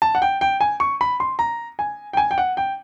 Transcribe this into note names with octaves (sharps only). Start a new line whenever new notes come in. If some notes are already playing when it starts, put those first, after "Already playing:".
A5
F#5
G5
G5
G#5
C#6
B5
C6
A#5
G#5
G5
G#5
G5
F#5
G5